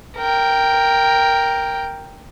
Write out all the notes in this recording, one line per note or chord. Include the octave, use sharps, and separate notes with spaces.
A#4 G5